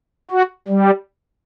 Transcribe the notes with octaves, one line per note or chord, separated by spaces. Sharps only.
F#4
G3